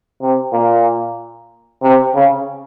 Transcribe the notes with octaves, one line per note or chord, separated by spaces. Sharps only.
C3
A#2
C3
C#3